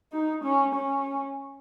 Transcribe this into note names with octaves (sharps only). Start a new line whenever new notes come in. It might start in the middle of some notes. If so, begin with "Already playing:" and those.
D#4
C#4
C#4